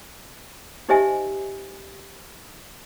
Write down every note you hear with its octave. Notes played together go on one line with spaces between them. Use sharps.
D#4 G4 C5 D#5 E5 G#5